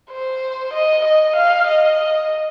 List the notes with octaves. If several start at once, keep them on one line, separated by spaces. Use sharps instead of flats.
C5
D#5
D#5
F5
D#5